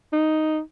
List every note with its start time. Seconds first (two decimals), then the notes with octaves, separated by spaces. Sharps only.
0.13 D#4